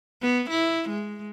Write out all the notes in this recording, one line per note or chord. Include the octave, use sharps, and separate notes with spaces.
B3
E4
G#3